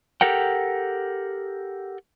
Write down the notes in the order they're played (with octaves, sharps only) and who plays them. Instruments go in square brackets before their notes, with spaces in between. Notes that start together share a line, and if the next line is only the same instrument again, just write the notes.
[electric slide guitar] G4 A4 A#4 F#5 G5